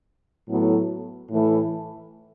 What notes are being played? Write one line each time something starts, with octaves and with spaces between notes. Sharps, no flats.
A2 F#3 B3 A4
A2 E3 A3 E4 A4